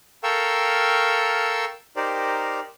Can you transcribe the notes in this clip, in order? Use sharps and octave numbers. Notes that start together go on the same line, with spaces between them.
A4 A#4 F5 G5 C#6 E6
D#4 G4 A#4 C5 D5